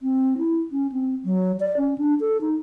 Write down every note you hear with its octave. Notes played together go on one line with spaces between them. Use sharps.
C4
E4
C#4
C4
F#3
D5
C#4
D4
A4
D#4